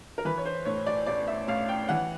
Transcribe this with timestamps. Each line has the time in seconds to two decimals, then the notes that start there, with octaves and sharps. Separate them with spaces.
0.18 A#4
0.25 E3 B4
0.38 C#5
0.45 C5
0.65 A2 C#5
0.87 D5
1.06 A1 D5
1.28 E5
1.48 A1 F5
1.69 G5
1.89 E3 F#5